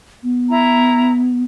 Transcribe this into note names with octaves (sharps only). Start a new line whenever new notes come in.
B3
E4 A#5